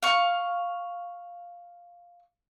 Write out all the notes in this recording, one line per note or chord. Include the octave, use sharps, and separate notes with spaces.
F5 C#6